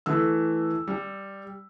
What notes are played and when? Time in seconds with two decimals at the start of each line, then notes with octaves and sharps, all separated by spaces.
0.06 E3 A3 E6
0.88 G3